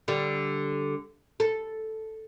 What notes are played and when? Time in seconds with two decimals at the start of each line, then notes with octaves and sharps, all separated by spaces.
0.08 D3 G3
1.40 A4